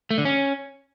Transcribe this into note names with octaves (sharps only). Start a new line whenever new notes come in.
A3
D3
C#4